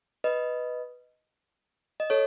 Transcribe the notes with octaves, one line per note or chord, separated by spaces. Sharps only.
B4 D#5
D#5
A4 C#5